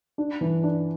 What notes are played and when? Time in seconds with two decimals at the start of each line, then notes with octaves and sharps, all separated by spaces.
0.18 D4
0.41 E3
0.64 D4